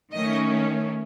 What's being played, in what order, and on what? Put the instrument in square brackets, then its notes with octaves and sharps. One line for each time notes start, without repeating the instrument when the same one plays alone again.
[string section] D#3 A3 C#4 D#5